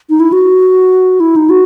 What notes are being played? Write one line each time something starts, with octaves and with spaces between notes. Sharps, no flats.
D#4
E4
F#4
E4
D#4
F#4